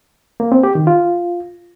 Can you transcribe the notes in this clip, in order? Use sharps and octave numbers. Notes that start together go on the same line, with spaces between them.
A#3
C4
G4
D#3
F4